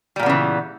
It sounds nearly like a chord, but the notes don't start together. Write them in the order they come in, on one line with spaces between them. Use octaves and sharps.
G3 A#2 B3 C#3 E3